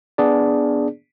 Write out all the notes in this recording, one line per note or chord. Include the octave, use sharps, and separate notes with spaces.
B3 D4 G#4 D5